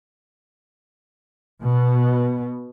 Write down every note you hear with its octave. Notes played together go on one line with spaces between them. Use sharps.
B2